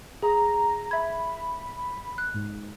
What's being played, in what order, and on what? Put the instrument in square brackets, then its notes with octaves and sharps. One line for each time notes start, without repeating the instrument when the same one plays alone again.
[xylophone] G#4 [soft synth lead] A#5
[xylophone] E5 G#6 [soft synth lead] B5
[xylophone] F#6
[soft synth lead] G#2